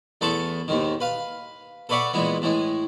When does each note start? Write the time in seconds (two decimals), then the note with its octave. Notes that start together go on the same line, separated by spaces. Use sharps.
0.21 E2 A3 B3 A4 A5 C6
0.68 D#2 G#2 D#3
1.00 B4 F5
1.89 A4 B4 C#5 D5 E5 F#5
2.13 A#2 E3 G#3 B3
2.42 A2 E3 G#3